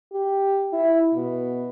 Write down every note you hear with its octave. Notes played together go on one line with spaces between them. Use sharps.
G4
E4
B2